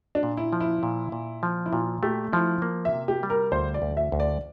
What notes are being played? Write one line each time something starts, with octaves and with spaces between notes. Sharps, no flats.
D4
A#2
E4
F3
E4
A#2
A#2
F3
E4
A#2 F4
A3 G4
F3 E4
A#3
E5
C3
G4
G3
A#4
D2 C5
D5
D2
E5
D2
D5